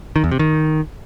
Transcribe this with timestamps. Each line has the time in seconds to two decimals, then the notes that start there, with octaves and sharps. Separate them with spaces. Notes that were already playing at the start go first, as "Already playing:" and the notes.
0.16 D#3
0.24 E2
0.31 C3
0.39 D#3